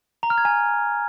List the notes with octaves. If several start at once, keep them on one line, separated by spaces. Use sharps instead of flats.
A#5
F6
G#6
G#5